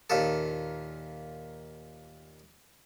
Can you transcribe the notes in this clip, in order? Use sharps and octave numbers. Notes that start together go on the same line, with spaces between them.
D#2 A#2 A4